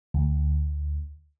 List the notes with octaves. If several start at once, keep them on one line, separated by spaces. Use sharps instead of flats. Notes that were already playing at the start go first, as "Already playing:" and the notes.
D2